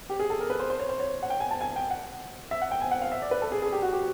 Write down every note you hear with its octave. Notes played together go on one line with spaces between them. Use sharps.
G4
G#4
A4
A#4
B4
C5
C5
C#5
C5
C#5
F#5
G5
G#5
A5
G#5
G5
F#5
E5
F#5
G5
G#5
F#5
F5
E5
D5
B4
A4
G#4
G#4
G4
F#4
G4